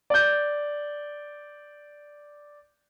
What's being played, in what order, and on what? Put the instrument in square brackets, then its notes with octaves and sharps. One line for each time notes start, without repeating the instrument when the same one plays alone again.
[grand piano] D5 G6